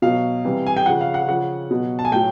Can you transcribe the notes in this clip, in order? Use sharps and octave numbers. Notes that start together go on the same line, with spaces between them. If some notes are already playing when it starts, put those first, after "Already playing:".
B2 F#3 F5
C3 E3 G3
G#5
G5
C#3 F3 F#5
F5
F#5
C#3 F3 F#5
B2 F#3
A5
G#5
A2 F#3 G5